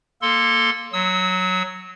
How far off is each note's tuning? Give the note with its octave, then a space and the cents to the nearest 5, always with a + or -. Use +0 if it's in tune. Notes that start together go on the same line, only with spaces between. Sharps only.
A#3 +0 A4 +0 C6 +0
F#3 +0 E6 -45